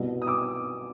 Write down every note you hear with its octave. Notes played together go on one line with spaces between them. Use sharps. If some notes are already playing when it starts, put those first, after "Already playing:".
Already playing: C2 B2
D#6
D6 E6